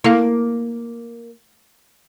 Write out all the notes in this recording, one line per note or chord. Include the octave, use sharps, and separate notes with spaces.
A#3 E4 A4 F5